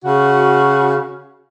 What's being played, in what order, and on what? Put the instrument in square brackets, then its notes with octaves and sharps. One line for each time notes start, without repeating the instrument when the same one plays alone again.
[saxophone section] C#3 F#4